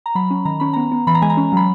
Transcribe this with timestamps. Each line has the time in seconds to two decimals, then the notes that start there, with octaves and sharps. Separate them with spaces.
0.06 A#5
0.15 F#3 B5
0.31 C#4
0.45 D#3 A#5
0.60 C#4 B5
0.73 B3 A#5
0.92 B3
1.07 E3 B5
1.15 A#5
1.22 G#3 G#5
1.30 A#5
1.37 C#4
1.52 F#3 B5